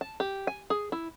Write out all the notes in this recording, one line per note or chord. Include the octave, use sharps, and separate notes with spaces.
A5
G4
G#5
G#4
E4